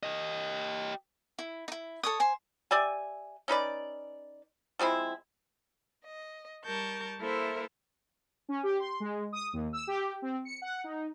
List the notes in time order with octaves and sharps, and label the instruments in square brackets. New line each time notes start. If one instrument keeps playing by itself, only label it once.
[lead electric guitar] G4 D#5
[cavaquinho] E4
D#4 E4
A4 C#5 D#6
C5 G#5
[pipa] G4 D5 E5 G#5
C#4 D#4 B4 D5
F3 G#3 C4 E4
[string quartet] D#5
G3 A#4 A5 C#6 G6
A#3 E4 A4 A#4 C5 E5
[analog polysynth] C#4
G4
C6
G#3
D#6
D#2
E6
G4
C4
C#7
F#5
D#4